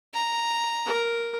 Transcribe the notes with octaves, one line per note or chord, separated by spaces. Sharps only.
A#5
A#4